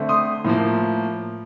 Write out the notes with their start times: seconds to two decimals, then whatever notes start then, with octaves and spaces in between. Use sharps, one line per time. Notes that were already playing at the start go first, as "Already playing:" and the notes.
Already playing: D3 A3 C4
0.09 C6 D#6
0.45 A2 F3 A#3